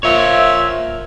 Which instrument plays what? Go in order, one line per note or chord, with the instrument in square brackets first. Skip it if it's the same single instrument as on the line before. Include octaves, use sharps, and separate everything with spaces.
[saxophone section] A#2 F3 E5 [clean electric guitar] F4 C#5